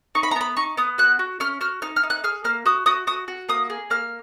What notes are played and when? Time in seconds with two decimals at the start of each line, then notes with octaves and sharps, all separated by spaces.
0.15 D#4 C#6
0.23 B5
0.31 A#5
0.36 B3 B5
0.57 D#4 C#6
0.77 B3 D#6
0.98 F#4 F#6
1.19 F#4
1.40 C#4 F6
1.61 F#4 F6
1.82 D#4 F6
1.96 F6
2.03 D#4
2.10 F#6
2.24 G#4 F6
2.44 A#3 F6
2.66 F#4 D#6
2.86 F#4 D#6
3.07 F#4 D#6
3.28 F#4
3.49 A#3 D#6
3.70 G#4
3.90 A#3 F6